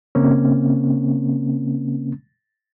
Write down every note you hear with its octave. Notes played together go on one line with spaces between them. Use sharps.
C#3 A#3 C4 C#4